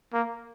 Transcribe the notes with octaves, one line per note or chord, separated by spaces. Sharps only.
A#3